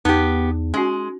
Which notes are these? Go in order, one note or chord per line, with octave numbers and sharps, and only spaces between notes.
E2 B3 D#4 G4
G#3 C#4 F#4